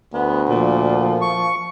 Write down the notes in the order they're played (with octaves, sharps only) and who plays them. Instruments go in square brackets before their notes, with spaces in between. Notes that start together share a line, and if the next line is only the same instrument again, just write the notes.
[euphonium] D2 [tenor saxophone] B3
[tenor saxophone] A#2 [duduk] F3
[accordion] C#6